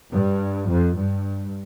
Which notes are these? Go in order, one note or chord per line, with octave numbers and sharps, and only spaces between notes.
G2
F2
G2